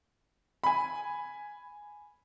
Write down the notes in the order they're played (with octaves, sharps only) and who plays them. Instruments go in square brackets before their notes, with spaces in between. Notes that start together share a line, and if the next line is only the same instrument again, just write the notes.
[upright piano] G#5 B5